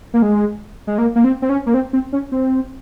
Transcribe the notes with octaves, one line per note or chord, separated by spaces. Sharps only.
A#3
G#3
G#3
A#3
A#3
C4
C4
C#4
A#3
C4
C4
C#4
C4